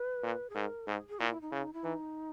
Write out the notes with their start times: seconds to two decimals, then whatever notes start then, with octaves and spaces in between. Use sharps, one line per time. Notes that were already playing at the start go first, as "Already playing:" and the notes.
Already playing: B4
0.23 A#2
0.50 G#4
0.55 G#2 A#4
0.87 G#2 G#4
1.09 G#4
1.19 A#2 E4
1.30 E4
1.41 D#4
1.51 C#3 E4
1.62 D#4
1.73 E4
1.84 E3 D#4